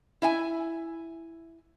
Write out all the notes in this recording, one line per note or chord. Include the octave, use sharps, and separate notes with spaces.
E4 E5 G#5